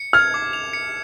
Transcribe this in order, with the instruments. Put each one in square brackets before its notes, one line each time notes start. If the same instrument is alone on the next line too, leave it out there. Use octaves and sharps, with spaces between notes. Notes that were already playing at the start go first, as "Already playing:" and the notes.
Already playing: [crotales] C#7
[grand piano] F6 [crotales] G#6
[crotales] D6
F7
C#7